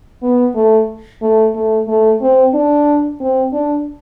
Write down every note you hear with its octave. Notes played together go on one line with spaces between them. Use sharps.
B3
A3
A3
A3
A3
C4
D4
C4
D4